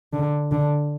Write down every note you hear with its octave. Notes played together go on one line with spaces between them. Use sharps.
D3
D3